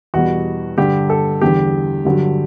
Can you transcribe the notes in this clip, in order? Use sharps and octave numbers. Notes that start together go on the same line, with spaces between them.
E2 B2 G3 F#4
G2 D3 G3 G4
A4
E2 D3 G3 G4
G2 D3 F#3